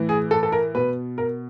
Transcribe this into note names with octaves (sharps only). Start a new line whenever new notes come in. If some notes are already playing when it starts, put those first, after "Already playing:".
Already playing: A2 E3
G#4
A4
A4
A#4
B2 B4
A#4